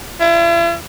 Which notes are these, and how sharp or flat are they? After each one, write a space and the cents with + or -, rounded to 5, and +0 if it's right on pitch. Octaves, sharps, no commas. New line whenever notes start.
E4 +45